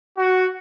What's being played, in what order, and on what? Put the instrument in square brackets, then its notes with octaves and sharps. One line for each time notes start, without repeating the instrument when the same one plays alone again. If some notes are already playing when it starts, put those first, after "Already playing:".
[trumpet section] F#4